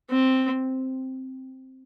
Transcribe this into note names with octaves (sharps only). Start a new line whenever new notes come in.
C4